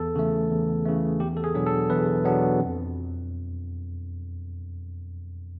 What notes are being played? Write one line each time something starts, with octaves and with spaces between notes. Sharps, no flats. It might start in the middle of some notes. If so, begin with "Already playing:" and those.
Already playing: E2 A4
C#3 E3 A3
E2
C#3 E3 A3
E2 G4
A4
G#4
B2 F#3 B3 D4
A4
E2 B4
B2 F#3 B3 D4
F2